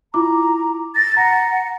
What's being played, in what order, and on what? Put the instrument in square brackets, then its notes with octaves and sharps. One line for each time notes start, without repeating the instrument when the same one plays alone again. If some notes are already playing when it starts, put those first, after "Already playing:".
[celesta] E4 F4 D6 [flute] A#5
[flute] A6 [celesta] A#6
[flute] F#5 [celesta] A#5 A#6